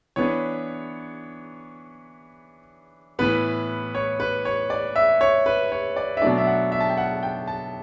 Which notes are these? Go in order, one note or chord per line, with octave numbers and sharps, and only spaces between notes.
E3 B3 D4 C#5
A2 E3 B3 B4
C#5
B4
C#5
D5
E5
C#5
B4
C#5
D5
E5
B2 F#3 A3 D4 D5
E5
F#5
E5
A5
G5
F#5
G5
A5